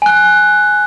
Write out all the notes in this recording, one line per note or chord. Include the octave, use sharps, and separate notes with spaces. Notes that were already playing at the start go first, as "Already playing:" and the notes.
G#5 F#6